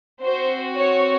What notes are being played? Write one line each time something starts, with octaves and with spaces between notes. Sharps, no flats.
C4 F#4 C5
C#5